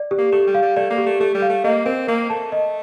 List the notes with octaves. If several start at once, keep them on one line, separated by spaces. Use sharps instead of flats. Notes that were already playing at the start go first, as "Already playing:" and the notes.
Already playing: D5
G4
A#3
A3 G4
G3
F5
G3
A3 D5
A#3
G4
A3
A3 G4
G3
F5
A3
A#3 D#5
C4 A#4
A#3 A#4
A3 A5
D#5